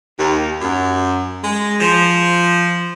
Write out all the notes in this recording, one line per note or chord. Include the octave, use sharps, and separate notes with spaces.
D#2
F#2
G#3
F3